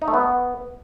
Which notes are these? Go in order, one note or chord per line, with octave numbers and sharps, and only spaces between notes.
D#4
A3
B3